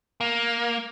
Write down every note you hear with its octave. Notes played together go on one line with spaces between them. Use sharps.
A#3